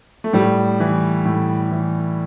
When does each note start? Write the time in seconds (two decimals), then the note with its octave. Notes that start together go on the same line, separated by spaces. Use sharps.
0.24 A3
0.33 A2 G3
0.80 E3
1.26 A2
1.71 E3